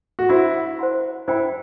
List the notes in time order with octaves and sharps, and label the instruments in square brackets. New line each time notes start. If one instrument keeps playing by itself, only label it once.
[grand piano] F#4
[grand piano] E4 [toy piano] C5 F#5 C6
[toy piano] C5 F#5 C6
[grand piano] E4 [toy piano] C5 G5 B5